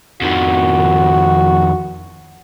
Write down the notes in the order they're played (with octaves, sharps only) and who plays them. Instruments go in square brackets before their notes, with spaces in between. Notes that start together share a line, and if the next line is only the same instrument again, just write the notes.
[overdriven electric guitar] F2 D#3 [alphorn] F#4